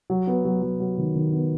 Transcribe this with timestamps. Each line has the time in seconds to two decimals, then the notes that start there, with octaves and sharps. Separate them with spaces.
0.10 F#3
0.27 B3
0.45 F#3
0.62 F#3
0.80 F#3
0.98 D#3
1.15 D#3
1.33 B3